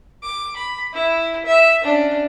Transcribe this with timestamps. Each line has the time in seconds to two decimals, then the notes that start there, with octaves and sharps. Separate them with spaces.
0.23 D6
0.56 B5
0.93 E4
1.46 E5
1.84 C#4 D4